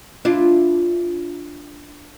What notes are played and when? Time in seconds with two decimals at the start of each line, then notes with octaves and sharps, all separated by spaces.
0.25 D4 E4 F4